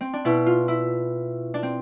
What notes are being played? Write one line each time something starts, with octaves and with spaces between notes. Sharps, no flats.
C4
D4
B2 E4
F4
E4
D4
C4